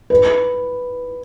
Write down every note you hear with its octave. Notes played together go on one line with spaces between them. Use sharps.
B4